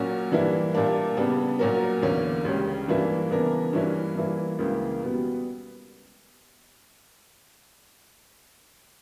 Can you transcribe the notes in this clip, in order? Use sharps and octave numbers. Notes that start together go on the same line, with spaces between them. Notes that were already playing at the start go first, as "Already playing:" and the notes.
Already playing: A#2 F#3 C#4 F#4 A#4
G2 E3 G3 A#3 E4
A#2 G3 A#3 D4
C#3 G3 B3 D4
A#2 F#3 C#4 F#4 A#4
E2 D3 A#3 C#4
C#2 C#3 G3 C#4
G2 E3 A#3 E4
C#3 E3 B3 D4 A#4
G2 E3 A#3 C#4 E4
G2 E3 A#3 E4
C#2 C#3 E3 A#3
B2 G3 B3